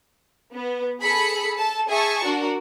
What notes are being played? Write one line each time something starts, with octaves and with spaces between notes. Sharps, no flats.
B3
G#4 A4 B5 C#7
A4 A5
G#4 E5 G#5 A5 C#6
D4 F#4 A#4